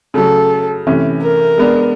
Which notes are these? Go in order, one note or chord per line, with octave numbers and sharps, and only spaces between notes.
C#3 F#3 A3 A4
C3 E3 A3 C#4
A#4
G#3 B3 D4